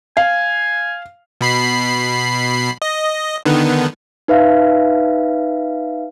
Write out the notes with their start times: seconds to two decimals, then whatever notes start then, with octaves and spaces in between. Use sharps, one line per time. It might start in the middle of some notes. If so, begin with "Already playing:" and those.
0.17 F5 G#5
1.41 B2 B5 C7
2.82 D#5
3.46 D3 D#3 B3
4.28 D#4 B4 E5 F5